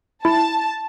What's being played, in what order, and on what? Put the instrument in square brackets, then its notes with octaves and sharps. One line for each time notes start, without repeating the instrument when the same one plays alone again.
[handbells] E4 [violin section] A5